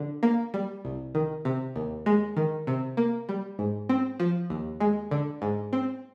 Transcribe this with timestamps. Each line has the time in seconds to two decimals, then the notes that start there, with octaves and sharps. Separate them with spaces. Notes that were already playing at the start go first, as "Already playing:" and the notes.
Already playing: D3
0.23 A#3
0.54 G3
0.85 C2
1.15 D#3
1.45 C3
1.76 D#2
2.06 G#3
2.37 D#3
2.67 C3
2.97 A#3
3.29 G3
3.59 G#2
3.89 C4
4.20 F3
4.50 D#2
4.80 G#3
5.11 D3
5.42 G#2
5.73 C4